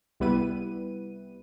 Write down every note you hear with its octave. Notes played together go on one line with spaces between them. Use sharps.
C2 G3 B3 E4 B4 D#7